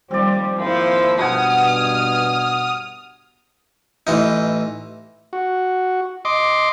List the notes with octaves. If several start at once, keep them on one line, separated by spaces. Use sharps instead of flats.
D#2 F3 G3 C4 C5 D5
G#1 F3 A#3 E4 C5
G2 B2 F#5 G#5 D#6 F6
A1 E3 D#4
F#4
D#5 C6 D6